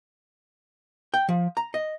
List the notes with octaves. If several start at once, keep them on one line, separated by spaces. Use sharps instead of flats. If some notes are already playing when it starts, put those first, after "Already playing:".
G5
F3
A#5
D#5